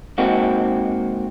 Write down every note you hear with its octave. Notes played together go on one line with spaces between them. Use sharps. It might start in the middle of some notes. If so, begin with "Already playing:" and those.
G#2 A#3 C4 F#4